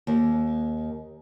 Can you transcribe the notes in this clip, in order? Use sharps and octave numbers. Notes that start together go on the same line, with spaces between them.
D#2